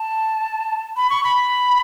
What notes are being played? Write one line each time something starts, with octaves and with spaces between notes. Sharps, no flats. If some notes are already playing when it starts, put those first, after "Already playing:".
Already playing: A5
B5
C#6
B5